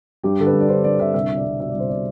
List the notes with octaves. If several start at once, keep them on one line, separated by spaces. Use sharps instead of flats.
G2 G4
D3 A4
B4
G2
D5
D3 C5
G2 D5
D3 E5
C2 E5
B2
D5
C2
B2 E5
C2 D5
C5
B2 D5